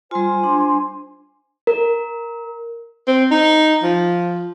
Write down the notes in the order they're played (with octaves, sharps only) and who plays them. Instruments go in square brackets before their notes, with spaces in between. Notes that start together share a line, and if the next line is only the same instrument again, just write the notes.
[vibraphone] G3 F4 [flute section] C5 G#5 C6
[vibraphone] D4
[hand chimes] A#4
[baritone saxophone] C4
D#4
F3